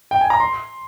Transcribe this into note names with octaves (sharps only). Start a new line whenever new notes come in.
G5
G#5
A#5
C6